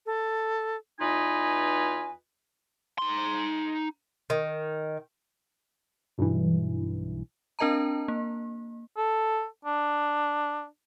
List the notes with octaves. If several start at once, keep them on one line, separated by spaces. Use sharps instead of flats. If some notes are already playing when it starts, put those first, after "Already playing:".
A4
E2 D#4 F4 B4 D#5 G#5
D#4 C6
D#3
B1 G2 E3
C4 D4 A#4 D#5 A5 A#5
A#3
A4
D4